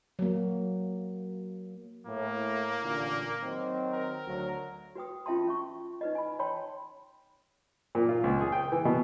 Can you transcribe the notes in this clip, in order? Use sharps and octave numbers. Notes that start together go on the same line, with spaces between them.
F#3 A#3
A2 A#3
A1 A#2 D3
D#3 F#3 C4
A#4
D2 F#3
F#4 B4 G5 D#6
C#4 F4 E5 G5 A5 C6
C#4 E5 C#6
D#4 B4 D#5
G#5 B5
C#5 G5 A5 B5 C6
A#2
F4
C#2
G#4
G5
E3
B2